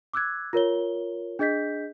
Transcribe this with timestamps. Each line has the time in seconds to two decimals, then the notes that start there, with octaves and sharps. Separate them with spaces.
0.13 D6 E6 F#6 G#6
0.53 F4 A#4 C#5 G7
1.39 D4 G#4 D#5 G6 B6